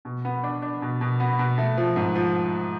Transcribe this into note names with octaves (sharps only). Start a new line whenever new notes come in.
B2
B3
D4
D4
B2
B2
B3
B2
A3
F3
G#2
F3